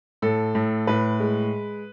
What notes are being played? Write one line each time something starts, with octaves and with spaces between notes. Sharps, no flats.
A2 A4
A2
A2 B4
G#3